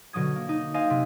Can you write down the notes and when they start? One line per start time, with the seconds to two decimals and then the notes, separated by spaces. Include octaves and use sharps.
0.13 B2 D3 F#3 D#6 G#6
0.36 A#3
0.49 D#4
0.74 C5 D#5 F5 G#5
0.90 C3